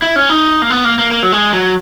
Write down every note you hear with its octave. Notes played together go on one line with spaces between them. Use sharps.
E4
C#4
D#4
A#3
B3
A#3
A#3
A#3
F#3
G#3
F#3